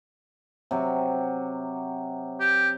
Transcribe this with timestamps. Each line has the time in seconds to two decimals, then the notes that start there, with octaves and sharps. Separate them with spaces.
0.71 C3 F#3
2.40 G4